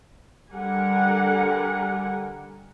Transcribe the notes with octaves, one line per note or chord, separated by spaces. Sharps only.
D3 G3 G4 A#4 F#5 G#5